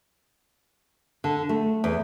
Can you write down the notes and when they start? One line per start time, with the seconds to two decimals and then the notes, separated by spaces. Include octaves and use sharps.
1.24 D3
1.49 A3
1.84 E2